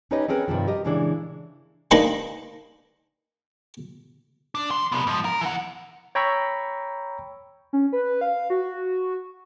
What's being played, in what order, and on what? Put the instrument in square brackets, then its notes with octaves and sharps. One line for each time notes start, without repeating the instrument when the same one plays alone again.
[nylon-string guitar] C#4 D#4 G4 B4 C#5 D#5
C4 C#4 G#4 A#4 B4
G2 C3 D#3 F3
G4 A#4 D#5
A#2 C#3 E3 G#3 D4
[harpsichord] A#3 D4 D#4 B4 F#5 G#5
[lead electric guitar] D4
E3 C6
C3 B3
G#2 F3
A#4
E3 F#5
[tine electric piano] C#5 G5 A#5 B5 C#6 E6
[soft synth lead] C#4
B4
F5
F#4